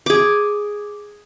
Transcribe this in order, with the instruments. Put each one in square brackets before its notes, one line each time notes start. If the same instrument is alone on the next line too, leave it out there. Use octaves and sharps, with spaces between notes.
[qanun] G#4 D6